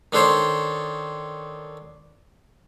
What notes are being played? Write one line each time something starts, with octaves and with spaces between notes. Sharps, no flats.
D#3 D4 A4 C5 C#5